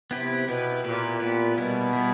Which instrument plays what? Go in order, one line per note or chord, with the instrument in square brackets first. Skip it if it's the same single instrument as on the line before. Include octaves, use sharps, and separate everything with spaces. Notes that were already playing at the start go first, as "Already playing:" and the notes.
[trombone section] C3 [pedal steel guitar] B3 E4 G4 B4
[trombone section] B2 [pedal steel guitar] B3 E4 G4 B4
[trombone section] A#2 [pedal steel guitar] B3 E4 G4 B4
[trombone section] A#2 [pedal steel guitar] B3 E4 G4 B4
[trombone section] B2 [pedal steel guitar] G3 B3 E4
[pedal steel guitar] G3 B3 E4